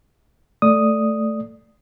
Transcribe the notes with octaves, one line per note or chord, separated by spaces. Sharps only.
A3 D5 D#6